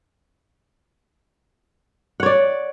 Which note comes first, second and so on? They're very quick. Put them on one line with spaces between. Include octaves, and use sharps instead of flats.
F#5 C#5 D5